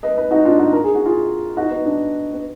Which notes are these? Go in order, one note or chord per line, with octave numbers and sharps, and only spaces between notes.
B4 D#5
B4 D#5
D#4 F#4
D4 F4
D#4 F#4
A#4
G#4
F#4
F4 G#4
D#4 F#4
B3 D#4
D4
B3